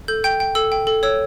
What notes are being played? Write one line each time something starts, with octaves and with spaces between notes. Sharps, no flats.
A4 G6
G5 G6
G5
A4 E6
G5
A4
C#5 E6